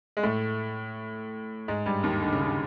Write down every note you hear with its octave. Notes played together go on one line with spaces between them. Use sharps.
G#3
A2 A3
G#2 G#3
G2 G3
D#2 D#3
D3
C#3
D3